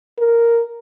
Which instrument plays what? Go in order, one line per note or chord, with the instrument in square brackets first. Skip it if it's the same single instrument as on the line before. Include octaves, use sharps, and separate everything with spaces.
[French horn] A#4